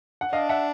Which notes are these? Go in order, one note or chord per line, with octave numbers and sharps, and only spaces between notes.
F#5
D4 D#5 F5
E5 F#5